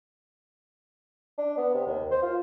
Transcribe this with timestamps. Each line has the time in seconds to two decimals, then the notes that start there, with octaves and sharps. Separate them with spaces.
1.38 D4
1.57 B3
1.74 C3
1.87 D#2
2.11 C5
2.23 F4